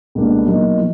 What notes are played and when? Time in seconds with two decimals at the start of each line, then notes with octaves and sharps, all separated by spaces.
0.15 C#2 B2 G3 A#3 D4
0.47 B2 F#3 A#3 D#4
0.78 F3